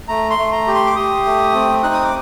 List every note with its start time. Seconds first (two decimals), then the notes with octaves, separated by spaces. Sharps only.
0.08 A3 A#5
0.30 C6
0.38 A3
0.52 A#5
0.67 G4
0.74 C6
0.87 D6
0.96 G4 D#6
1.25 A3
1.54 C4
1.83 D#4 F#6
1.94 D#6
2.04 D6